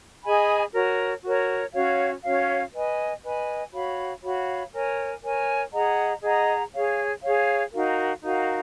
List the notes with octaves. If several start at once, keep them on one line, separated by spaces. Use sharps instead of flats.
G#4 D#5 G#5 B5
F#4 A#4 C#5
F#4 A#4 C#5
C#4 F#4 C#5 F5
C#4 F#4 C#5 F5
B4 D#5 G#5
B4 D#5 G#5
F#4 C#5 F5 B5
F#4 C#5 F5 B5
A#4 C#5 G#5
A#4 C#5 G#5
G#4 D#5 F#5 A#5
G#4 D#5 F#5 A#5
G#4 C#5 F5
G#4 C#5 F5
D#4 F#4 A#4 F5
D#4 F#4 A#4 F5